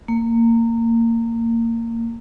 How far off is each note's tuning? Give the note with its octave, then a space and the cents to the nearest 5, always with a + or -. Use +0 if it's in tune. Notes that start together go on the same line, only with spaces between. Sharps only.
A#3 -20